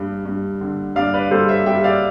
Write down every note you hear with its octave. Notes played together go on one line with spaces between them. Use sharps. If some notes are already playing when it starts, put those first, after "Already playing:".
Already playing: G2
G2
D3
G2 D5 F5
B4 D5
G3 A4 C5
C5 E5
G3 E5 G5
D5 F5